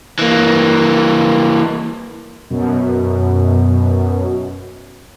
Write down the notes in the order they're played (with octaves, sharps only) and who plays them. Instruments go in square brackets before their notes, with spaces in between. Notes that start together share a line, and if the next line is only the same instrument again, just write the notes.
[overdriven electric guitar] E3 A#3
[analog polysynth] F#2 B2